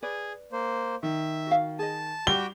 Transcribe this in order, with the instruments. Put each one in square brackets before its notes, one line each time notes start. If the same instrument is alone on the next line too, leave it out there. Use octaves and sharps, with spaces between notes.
[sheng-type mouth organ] G#4 [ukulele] B4 D5
[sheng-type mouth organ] A#3 C5
[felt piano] D#3 [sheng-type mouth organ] E5
[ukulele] F#4 F5
[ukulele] G#4 D#5 [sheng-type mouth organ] A5
[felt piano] G3 [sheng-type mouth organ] F#4 G4 G5 [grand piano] G7